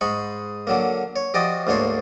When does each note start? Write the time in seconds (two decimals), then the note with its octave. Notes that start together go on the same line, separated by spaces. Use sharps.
0.01 G#2 G#3 B5 C#6
0.67 D3 F#3 A#3
1.16 C#5
1.34 F3 F#4 G4 D5 D#5
1.67 D2 G#2 A#3 D4 C#5 C6